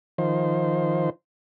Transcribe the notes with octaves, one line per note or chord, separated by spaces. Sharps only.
D#3 F3 C5